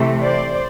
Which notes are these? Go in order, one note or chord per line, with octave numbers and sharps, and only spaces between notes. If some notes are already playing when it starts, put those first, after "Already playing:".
Already playing: C3 E3 A3
C5 D5